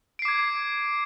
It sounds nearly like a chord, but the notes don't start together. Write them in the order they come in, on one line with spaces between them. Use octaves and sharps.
D7 C7 D6 G#6